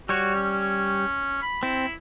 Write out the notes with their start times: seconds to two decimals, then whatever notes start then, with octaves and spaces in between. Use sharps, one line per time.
0.09 G3 F#4 C#5
0.35 C#4
1.42 B5
1.63 C4 E4